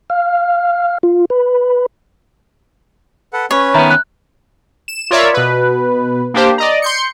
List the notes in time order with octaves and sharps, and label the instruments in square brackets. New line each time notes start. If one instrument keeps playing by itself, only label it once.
[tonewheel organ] F5
F4
B4
[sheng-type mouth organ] A4 B4 F#5
[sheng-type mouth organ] C#4 B4 [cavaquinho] C#5
[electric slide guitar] D#3 B3 [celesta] E5 A#5 B5
[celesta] F#6
[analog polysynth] E7
F4 A#4 C#5 D5 E5
B2 B4
A#3 D4 G4 C5
D5 D#5 A#5
C6 G6 C#7